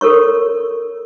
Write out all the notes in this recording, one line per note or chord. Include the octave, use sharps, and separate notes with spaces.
A4 A#4 C#5 C#6